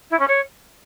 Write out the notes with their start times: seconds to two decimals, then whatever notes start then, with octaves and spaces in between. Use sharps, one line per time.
0.10 E4
0.19 C#4
0.27 C#5